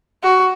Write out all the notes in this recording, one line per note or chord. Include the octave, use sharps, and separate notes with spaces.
F#4